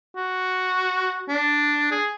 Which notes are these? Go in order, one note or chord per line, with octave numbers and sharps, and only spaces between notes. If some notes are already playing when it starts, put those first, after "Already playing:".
F#4
D4
G#4